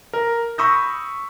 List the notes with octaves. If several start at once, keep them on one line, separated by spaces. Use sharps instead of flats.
A#4
B5 C#6 D#6 E6 G6 A#6